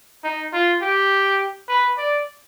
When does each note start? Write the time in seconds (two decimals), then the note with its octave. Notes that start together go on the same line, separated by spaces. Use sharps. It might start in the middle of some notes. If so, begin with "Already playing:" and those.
0.24 D#4
0.53 F4
0.82 G4
1.69 B4
1.98 D5